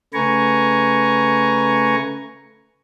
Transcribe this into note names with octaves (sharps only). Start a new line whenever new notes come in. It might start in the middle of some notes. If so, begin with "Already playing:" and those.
C#3 A3 B4 G#5 A#5 C#6